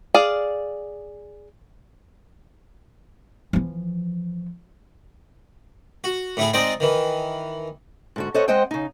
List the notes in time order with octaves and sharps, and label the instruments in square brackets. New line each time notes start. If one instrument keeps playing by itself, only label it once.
[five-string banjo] G#4 D5 F5
[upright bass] E3 F3
[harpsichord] F#4
A2 A3 E4 G#4
G#3 C4 D#4 D5 D#5 G5
D#3 E3
[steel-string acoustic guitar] G#2 D3 F#4
A4 C5 C#5 D#5 F#5
G#3 C4 C5 D#5 F#5 G5
C#3 D#4